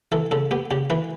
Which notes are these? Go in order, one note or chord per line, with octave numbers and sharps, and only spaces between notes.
E3 A4
C#3 A4
B3 G4
C#3 G4
E3 B4